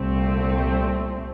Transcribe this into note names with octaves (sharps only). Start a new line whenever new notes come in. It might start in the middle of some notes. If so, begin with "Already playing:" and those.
Already playing: C2 A#2 A3 C4